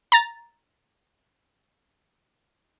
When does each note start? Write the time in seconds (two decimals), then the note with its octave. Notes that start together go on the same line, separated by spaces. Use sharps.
0.12 A#5 A6